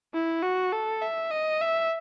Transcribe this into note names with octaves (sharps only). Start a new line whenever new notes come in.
E4
F#4
A4
E5
D#5
E5